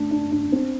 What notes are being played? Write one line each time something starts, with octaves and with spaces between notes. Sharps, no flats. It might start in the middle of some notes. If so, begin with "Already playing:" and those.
Already playing: A3 D4
D4
D4
C4